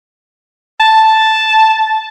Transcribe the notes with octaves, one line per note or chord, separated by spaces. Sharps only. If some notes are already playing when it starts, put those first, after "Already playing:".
A5